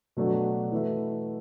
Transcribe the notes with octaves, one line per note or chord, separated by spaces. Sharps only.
B2 F#3 A3 D4 F#4
E3 A3 F#4 B4 E5